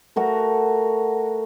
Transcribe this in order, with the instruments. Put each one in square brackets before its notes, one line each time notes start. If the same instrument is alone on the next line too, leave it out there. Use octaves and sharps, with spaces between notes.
[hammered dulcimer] A3 F#4 A#4 F#5